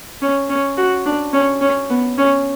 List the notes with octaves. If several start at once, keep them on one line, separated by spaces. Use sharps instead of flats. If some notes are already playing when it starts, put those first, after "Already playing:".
C#4
C#4
F#4
D4
C#4
C#4
B3
C#4